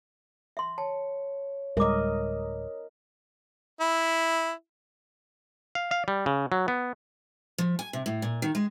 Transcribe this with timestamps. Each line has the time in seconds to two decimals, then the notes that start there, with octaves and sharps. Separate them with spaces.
0.57 E5 C6
0.78 C#5 A5
1.77 D1 G3 G#3 A#4 D#5 E5 D6
3.80 E4
5.75 F5
5.91 F5
6.08 G3
6.26 C#3
6.52 F#3
6.68 B3
7.58 F3
7.79 G#5
7.93 C3
8.06 A2
8.22 A#2
8.42 D#3
8.55 G#3